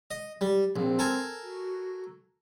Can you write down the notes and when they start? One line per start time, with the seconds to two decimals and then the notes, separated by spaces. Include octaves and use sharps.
0.11 D#5
0.41 G3
0.76 A#1 C4
0.99 A4 A#4 G#5
1.43 F#4